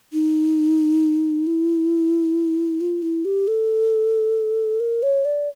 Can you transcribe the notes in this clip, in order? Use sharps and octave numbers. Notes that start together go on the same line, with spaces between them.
D#4
E4
F4
E4
G4
A4
A#4
C#5
D5